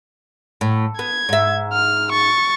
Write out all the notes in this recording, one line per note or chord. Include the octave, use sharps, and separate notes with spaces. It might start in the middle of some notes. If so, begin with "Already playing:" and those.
A2
B3 G#6
G#2 E5
F6
C#6 A6